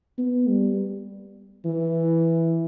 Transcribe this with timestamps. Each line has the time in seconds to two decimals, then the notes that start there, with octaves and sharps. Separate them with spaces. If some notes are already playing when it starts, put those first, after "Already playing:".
0.18 B3
0.49 G3
1.65 E3